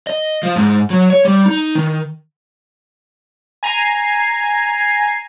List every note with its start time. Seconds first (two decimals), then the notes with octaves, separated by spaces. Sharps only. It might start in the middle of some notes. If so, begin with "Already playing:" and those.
0.07 D#5
0.43 F3
0.56 G#2
0.90 F#3
1.10 C#5
1.25 G3
1.46 D#4
1.75 D#3
3.63 G#5 A#5 G#6 C7